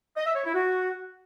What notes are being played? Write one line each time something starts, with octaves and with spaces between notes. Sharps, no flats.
D#5
E5
C#5
E4
F#4